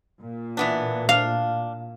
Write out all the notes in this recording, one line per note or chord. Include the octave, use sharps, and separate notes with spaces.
A#2
E3 B3 D4
D4 F5